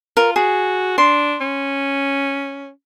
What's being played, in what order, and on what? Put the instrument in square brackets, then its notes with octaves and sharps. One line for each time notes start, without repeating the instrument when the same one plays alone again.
[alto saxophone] F4 [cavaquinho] A#4
[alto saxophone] F#4 [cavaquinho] G#4
[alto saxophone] D4 [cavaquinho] C6
[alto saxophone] C#4